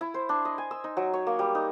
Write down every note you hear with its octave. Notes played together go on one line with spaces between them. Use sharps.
E4
C5
D4
D#5
G#5
E6
D#4
F#3
C#5
A#3
G3
D#4